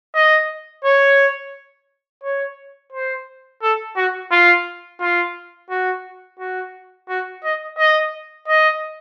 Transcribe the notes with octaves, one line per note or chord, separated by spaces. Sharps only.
D#5
C#5
C#5
C5
A4
F#4
F4
F4
F#4
F#4
F#4
D#5
D#5
D#5